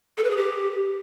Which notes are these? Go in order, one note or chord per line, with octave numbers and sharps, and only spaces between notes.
A4
B4
G#4
G4